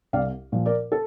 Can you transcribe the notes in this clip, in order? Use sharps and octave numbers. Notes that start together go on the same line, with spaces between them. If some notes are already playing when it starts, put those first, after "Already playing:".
C2 D5 F5
A#2 F3
A#4 D5
A4